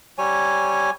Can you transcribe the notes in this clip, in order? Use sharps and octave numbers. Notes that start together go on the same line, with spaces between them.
G3 C#5 G#5